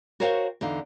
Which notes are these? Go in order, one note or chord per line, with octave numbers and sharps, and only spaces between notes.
F#4 A#4 C5 C#5 F5 G5
E2 D3 D#4 F5